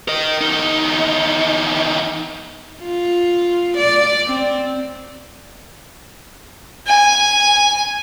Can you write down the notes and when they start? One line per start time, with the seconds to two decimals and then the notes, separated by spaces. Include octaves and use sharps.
0.08 A#4 D#5
0.41 E2 D#4
2.82 F4
3.77 D5
4.26 C4
6.87 G#5